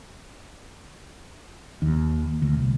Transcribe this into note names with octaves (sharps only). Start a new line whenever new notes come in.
D#2
D2
C2